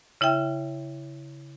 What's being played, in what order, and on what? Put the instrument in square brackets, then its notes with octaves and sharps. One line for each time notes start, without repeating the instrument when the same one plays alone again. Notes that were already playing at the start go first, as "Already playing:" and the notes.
[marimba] C#3 E4 E5 G5